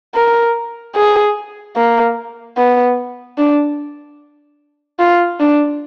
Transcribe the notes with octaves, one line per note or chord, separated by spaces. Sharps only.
A#4
G#4
A#3
B3
D4
F4
D4